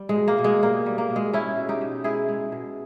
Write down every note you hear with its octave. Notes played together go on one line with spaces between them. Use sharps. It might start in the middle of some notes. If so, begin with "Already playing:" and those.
Already playing: G3
G#3
B2
A#3
B2
G#3
G3 A#3
G3
A#3
B2
G#3
G#3 C#4 E4
B2
D#4 G4
B2
G#3 E4 G#4
G#3
B2